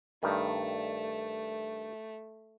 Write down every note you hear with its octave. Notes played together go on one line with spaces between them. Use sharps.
G2 D#3 A3